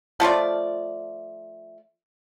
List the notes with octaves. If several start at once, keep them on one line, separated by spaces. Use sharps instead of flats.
F3 A3 F4 D5